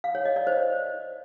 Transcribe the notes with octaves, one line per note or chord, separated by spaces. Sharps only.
F5
C#5
D#5
D5
C5